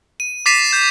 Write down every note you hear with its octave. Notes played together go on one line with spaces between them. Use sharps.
D#7
D6 A6 B6 C7 D#7 E7
G6 E7